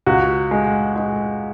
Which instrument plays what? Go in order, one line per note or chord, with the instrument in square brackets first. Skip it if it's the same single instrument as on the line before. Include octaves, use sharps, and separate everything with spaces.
[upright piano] C#2 F#4
G#3
G#3